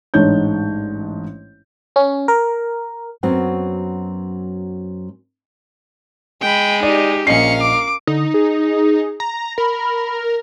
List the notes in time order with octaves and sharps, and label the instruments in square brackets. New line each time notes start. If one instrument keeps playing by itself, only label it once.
[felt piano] A1 G#2 D4 D#4 C#5 G6
[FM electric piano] C#4
A#4
[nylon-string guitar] F#2 F#3 B3 C4 F#4 F#5
[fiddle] G#3 [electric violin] G5 B5
[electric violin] D#4 G4 [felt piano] D5
[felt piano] A#1 D#5 C7 [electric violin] C#4 C#7 [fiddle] A#4 F5
[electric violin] D6
[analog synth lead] D3 [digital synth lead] D#4
[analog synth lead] G#4
[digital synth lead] A#5
[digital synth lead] A#4 [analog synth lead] B5